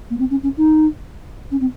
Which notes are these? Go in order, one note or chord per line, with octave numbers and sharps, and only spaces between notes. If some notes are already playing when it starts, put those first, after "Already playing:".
A#3
C4
C#4
C#4
D#4
C#4
C4